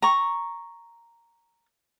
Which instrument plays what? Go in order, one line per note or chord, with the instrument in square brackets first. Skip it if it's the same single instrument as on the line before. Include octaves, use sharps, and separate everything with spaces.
[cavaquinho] A#5 C#6